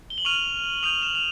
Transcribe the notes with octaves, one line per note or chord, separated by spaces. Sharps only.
G7
F#7
C#6 F6 D#7 F7
D#6 G6 D#7 F7
E7 F#7
F7